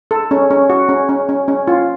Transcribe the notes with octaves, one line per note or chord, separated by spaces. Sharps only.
A4
C#4
C#4
F#4
C#4
C#4
C#4
C#4
F4